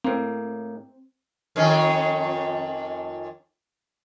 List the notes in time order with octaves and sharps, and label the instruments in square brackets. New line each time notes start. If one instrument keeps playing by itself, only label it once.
[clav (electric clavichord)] A2 A#3 [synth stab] C4
[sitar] F2 D#3 C#4